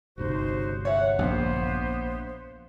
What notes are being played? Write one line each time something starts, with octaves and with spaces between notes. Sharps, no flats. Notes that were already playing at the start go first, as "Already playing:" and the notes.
G1 C#2 C3 D#4 F#4 C5
C#5 E5 F#5
A#1 A#3 B3 C5